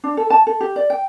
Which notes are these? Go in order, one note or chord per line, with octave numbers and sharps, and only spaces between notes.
D4
A4
A5
A4
G4
D5
G5